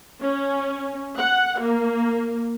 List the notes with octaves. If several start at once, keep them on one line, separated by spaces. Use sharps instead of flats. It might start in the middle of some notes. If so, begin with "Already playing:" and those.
C#4
F#5
A#3